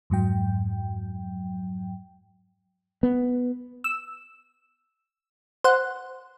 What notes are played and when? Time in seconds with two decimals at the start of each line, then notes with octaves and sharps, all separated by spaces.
0.10 F2 G#2 F#3 G5
3.03 B3
3.84 E6
5.64 C5 F#5